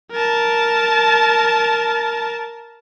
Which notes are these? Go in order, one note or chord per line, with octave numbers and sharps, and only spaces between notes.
A#4 A5